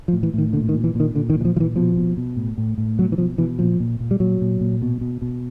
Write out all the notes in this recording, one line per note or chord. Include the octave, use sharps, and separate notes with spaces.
F3
A2
E3
A2 D#3
A#2 D3
D#3
A#2
E3
A#2 D#3
A#2 D3
D#3
A#2
E3
F3
A#2 E3 F3
B2 F3
B2
B2
A2
A2
A2
B2 F#3
E3
B2 F3
B2 E3
A#2 F3
A#2
A#2
G3
A#2 F#3
A#2
A#2
B2
B2
B2